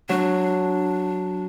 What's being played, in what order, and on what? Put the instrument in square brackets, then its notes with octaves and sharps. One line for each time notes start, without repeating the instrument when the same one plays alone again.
[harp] F#3 [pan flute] D4